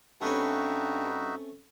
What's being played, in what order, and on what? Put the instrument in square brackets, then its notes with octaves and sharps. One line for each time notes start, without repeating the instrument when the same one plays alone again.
[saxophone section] G2 [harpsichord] A3 C4 C#4 [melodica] D#4 F#4 E5